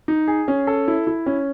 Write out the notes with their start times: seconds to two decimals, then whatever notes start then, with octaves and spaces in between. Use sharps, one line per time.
0.08 D#4
0.28 G#4
0.48 C#4
0.67 A4
0.88 E4
1.07 E4
1.26 C#4